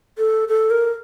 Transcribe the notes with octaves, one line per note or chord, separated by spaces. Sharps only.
A4
A4
A#4